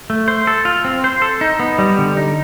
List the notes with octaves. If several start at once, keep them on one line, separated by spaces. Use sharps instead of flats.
A3
C5
A4
F4
C4
C5
A4
D#4
B3
G3
D3
D#4